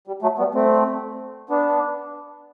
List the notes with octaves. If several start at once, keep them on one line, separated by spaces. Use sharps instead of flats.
G3
F#3 A3
G3 B3
A3 C4
B3 D4